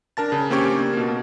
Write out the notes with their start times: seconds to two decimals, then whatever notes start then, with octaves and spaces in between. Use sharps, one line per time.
0.17 D4 A#4 A5 A6
0.32 C#3
0.50 A#3 C4 C#4 G4 C#6 G#6
0.73 A#3 D4
0.93 B2 A#3